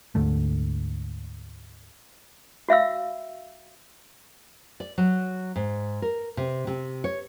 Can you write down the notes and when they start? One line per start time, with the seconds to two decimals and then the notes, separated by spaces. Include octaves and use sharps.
0.15 D2 G#2 D3 A3
2.69 F#4 E5 F5 E6
4.80 D5
4.98 F#3
5.56 G#2
6.02 A#4
6.37 C3
6.67 C3
7.04 C#5